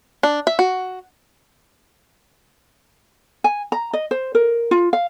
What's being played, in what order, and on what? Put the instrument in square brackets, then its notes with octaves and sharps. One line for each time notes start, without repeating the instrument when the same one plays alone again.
[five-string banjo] D4
E5
F#4
[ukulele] G#5
A#5
D#5
C5
A#4
F4
F5